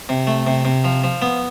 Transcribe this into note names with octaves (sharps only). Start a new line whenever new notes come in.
C3
A3
C3
C3
F3
F3
B3